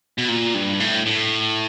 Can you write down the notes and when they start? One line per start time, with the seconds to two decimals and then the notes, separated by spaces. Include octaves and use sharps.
0.18 B2
0.29 A#2
0.55 G2
0.80 A2
1.06 A2